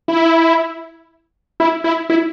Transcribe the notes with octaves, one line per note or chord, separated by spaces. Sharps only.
E4
E4
E4
E4